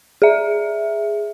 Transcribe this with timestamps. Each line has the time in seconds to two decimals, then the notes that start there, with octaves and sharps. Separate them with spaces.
0.22 G#4 E5